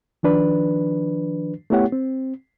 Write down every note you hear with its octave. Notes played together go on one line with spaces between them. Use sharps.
D#3 F3 D4 B4
A3 B3 E4 G4 C#5 F#5
C4